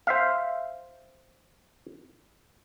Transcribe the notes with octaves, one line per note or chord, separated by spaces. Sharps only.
C5 E5 F5